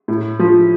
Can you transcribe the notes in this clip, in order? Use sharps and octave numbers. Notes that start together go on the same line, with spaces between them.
A2
F3